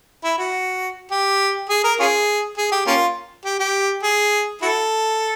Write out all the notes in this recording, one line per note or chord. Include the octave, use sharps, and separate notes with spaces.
E4
F#4
G4
G#4
A#4
C#4 F4 G#4
G#4
G4
A#3 C#4 F4
G4
G4
G#4
E4 F#4 A4